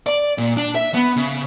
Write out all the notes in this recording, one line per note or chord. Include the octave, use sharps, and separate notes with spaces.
D5
A#2
D4
E5
B3
C#3